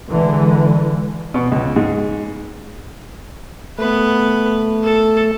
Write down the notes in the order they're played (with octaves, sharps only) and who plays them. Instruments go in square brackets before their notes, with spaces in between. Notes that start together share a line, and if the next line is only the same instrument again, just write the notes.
[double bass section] D3 E3 G#3
[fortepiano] B2
C#2
G#2
[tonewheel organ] A3 [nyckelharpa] B3 B4
[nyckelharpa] A4